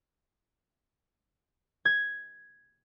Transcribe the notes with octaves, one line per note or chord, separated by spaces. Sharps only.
G#6